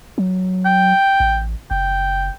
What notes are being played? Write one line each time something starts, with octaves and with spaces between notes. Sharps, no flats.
F#3
G5
A1
F#1 G5